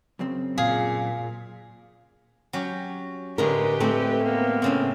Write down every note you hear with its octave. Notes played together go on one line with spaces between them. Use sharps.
F#2 C#3 C4
A#2 G#4 F5
F#3 C#4 G4
A2 D3 G#3 G4 A#4 B4
A3 C4
A#3 B3
A2 C#3 C4